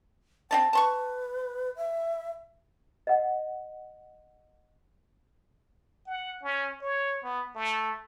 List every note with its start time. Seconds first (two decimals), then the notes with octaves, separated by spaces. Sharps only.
0.51 C4 D#4 G5 A5
0.73 B4 A5 C6 C#6
1.76 E5
3.07 D#5 F#5
6.07 F#5
6.43 C#4
6.82 C#5
7.24 B3
7.55 A3